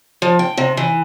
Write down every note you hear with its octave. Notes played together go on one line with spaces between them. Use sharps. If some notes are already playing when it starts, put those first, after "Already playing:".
F3
G5
C3
E3